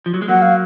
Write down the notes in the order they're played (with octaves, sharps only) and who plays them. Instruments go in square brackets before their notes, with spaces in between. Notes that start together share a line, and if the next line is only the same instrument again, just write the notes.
[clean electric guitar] F3
F#3
G#3
[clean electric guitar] F#3 A#3 [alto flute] F#5
[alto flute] F5